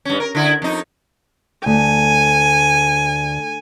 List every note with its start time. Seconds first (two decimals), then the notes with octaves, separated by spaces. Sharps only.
0.05 G2 C#4
0.20 A#4
0.35 D3 E4
0.62 F2 D#4
1.66 D2 G#5